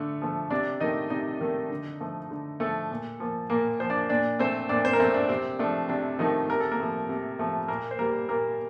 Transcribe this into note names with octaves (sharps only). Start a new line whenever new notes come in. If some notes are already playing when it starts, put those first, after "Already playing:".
Already playing: D3 A3
F3 A3
C3 D4 D5
D#3 A3 D#4 D#5
C3 D#4 D#5
D#3 A3
D3
F3 A3
D3
F3 A3 A4
A#2
F3 A#3
A#2 A#3 A#4
F3 A#3 C5
D4 D5
A#2 D4 D5
A3 C4 C5
A#2 D4 D5
C4 C5
A#4
A3 C4 C5
D4
C3 C4
F3 A3 D4
C3 D4
D#3 F3 A3 D#4
C3 A#4
A4
A#3 A#4
F3 A3
C3
F3 A3
A#2 A#3 A#4
C5
G3 A#3 A#4
A#2 A#3 A#4